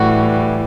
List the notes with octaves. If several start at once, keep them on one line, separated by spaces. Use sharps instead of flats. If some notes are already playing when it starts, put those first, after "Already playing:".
Already playing: A2 E3 G3 F#4